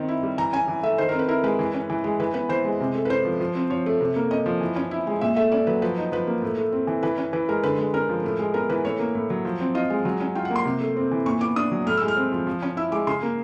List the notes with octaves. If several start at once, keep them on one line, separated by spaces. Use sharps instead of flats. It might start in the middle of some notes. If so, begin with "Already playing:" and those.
Already playing: D#3 C4
E4
G3
E3 A#5
C#4 G#5
E3
A3 E5
D#3 C5
C4 A#4
B4
E4 A#4
G#3 B4
E3
C#4
E3
G#3
E3 B4
B3 B4
E3 C5
G#3
C3
A3
B4
C#4 C5
F3
F3
C4
F3 C#5
A3
C3
A#3
C#4 D#5
F3
E3
C#4
E4
G#3
A#2 E5
A3 E5
C#4 D5
F#3 B4
F3 B4
D#4
F3 B4
A#3
A2
A3
C4
E3
E3 B4
C#4
E3 B4
G#3 A#4
D3 B4
G#3
C#4 A#4
F3
A2
G#3
B3 A#4
E3 B4
A2 C#5
A#3
A2
F#3
F3
C4
F4 D#5
G#3
F#3
C#4
F4 G5
F#5
A#3
C6
C3
A3
C4
E3
A#2 C#6
B3 D6
D4 D#6
F#3
A2 F6
G#3 E6
F6
C4
F3
F3
C#4
E4 E6
G#3 D6
C#3 C6
A#3